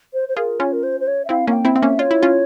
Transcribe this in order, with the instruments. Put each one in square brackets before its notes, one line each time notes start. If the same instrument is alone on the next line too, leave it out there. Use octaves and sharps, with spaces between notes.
[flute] C5
C5
[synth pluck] F4 G#4 [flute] A#4
[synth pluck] C#4 F4 [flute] C#5
[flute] A#4
C5
C5
C#5
E5
[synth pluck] C4 E4 [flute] F5
[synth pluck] A#3 C#4 [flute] F5
[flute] G5
[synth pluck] C4 E4
[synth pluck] C4 [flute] E5
[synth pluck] A#3 C#4
[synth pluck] F4 [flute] C#5
[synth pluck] E4
C#4 F4